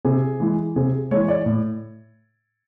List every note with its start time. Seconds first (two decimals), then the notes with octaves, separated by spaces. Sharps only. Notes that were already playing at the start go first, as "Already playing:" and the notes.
0.05 C3 G#4
0.40 E3 G#3
0.76 C3 G#4
1.11 E3 G#3 C#5
1.28 D5
1.46 A2